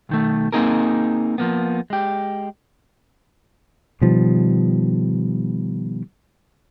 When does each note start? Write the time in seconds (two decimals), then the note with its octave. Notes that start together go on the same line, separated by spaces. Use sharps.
0.09 B1 D#3 A3
0.53 A#3 C4 D#4 G#4 A#4
1.38 F3 A#3 B3
1.90 G#3 G4
4.01 B2 D#3 F3 G3